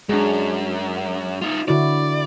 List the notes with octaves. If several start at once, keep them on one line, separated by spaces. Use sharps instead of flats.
F#2 G#3 D4
D#4 F4
D3 E4 F#4 D5